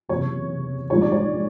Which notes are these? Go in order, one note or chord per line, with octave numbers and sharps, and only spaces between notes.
F#1 E2 C3 E3 C#5
A#1 G#2 E3 G3 C#5
D5
C#5